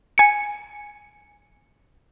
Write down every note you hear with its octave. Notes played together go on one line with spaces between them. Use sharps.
G#5 C#7